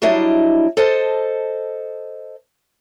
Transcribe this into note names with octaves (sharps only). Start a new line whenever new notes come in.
F#3 G3 D4 E4 D#5
A4 C5 D#5 A5